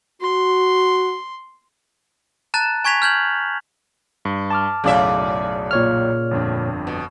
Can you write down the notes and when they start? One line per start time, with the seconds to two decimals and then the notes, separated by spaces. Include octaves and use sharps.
0.22 F#4 C6
2.54 A5 A#5 F#6 A6 E7
2.85 G#5 C#6 G#6 B6 F7
3.02 F6 G6 G#6 F#7
4.25 G2
4.50 A5 D6 F6
4.84 B1 F#2 A2 C#3 D5 E5
5.71 A#2 C#5 F6
6.31 G1 F2 D4
6.87 B2